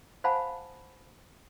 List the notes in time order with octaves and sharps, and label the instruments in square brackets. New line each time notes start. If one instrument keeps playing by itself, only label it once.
[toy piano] C5 F5 F#5 G#5 A5 B5